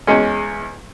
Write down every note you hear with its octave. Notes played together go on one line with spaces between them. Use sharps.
E2 G#3 C#4